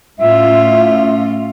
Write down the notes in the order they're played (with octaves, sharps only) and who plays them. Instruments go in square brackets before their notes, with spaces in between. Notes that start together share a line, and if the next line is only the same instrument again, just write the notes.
[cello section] A2 C#4 F4 [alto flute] E5